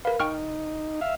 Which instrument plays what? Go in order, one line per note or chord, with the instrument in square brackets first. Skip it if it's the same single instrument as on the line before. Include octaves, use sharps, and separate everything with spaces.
[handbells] A#4 F5 [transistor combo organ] B4
[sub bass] F1 [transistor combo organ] D#4 [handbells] G5 C#6 F6
[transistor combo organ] E5 F5